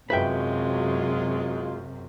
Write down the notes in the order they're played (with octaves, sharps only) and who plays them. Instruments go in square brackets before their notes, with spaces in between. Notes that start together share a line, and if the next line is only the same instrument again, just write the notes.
[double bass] F#2 [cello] C3 [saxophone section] F#3 G#3 F4 [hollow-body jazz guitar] B4 E5 G5